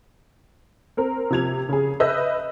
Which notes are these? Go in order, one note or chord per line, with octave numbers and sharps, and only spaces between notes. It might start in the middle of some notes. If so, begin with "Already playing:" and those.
C4 A#4
C3 F3 G#6 F7
C#3 G#4
B4 D#5 E5 E6 G6